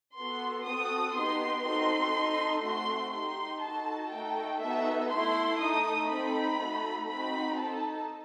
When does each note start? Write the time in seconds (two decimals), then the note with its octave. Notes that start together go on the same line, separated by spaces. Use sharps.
0.18 B3 F#4 A4 C6
0.68 C4 F#4 A4 D#6
1.17 B3 D#4 G4 C6
1.66 C4 D#4 F#4 A4 C6
2.16 D#4 A4
2.65 A3 C4 F#4 C6
3.14 D#4 G4 C6
3.64 D#4 F#4 A4 A5
4.13 A3 D#4 F#4 A4 G5
4.62 B3 D#4 F#4 A4 E5
5.12 A3 E4 A4 C6
5.61 A3 D#4 A4 D#6
6.11 C4 D#4 A4 B5
6.60 A3 D#4 F#4 A4
7.10 C4 D#4 F#4 B5
7.59 D#4 A4 A5